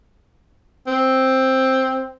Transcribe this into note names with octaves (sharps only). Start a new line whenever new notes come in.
C4